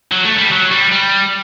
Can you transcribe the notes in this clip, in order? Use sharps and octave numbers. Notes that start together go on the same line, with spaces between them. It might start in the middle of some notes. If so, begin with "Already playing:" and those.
F#3
A3
G3
F#3
G3
G3